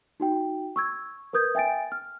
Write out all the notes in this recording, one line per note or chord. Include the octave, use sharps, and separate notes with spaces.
D#4 F#4 G5
C#6 E6 G#6
A#4 B4 D#6 G6 G#6
E5 G5 G#5 A6 D7
F6